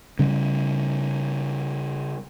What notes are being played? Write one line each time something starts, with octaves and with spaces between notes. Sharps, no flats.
C#3 G3